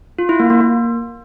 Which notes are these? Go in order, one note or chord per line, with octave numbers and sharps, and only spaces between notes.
F4
E4
A#3
A#3
A#3